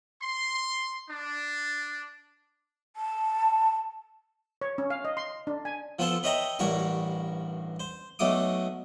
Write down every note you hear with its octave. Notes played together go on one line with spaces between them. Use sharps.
C6
D4
A5
C#5
C#4
F5
D#5
C6
D4
G#5
F3 B3 F4 A4 C5 C6
B4 C#5 D#5 E5 G5 A#5
A1 G2 F#4 A#4 C#5 C#6
C5
B1 F#3 A3 D#4 D6 D#6